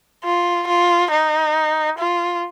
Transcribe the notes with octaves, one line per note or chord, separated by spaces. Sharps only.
F4
F4
D#4
F4